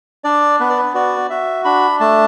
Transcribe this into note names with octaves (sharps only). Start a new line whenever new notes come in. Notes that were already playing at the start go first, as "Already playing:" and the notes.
D4 D5
B3 B4
D5
B4
F#4 D5
F#4 E5
D4 B5
A3 A5